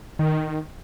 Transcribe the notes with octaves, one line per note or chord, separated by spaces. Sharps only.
D#3